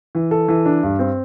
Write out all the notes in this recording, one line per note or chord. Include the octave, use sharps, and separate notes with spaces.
E3
A4
E3
D4
G2
C4